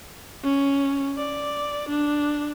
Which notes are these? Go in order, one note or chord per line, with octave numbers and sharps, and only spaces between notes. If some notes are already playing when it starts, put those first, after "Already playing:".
C#4
D5
D4